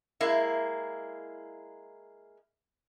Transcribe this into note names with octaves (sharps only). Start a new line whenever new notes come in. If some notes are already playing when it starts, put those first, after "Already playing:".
G#3 A#3 E4